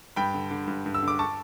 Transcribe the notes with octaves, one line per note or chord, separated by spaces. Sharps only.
G2 G5 B5
D3
D3
G2
G2
E6
D3
D6
A5 C#6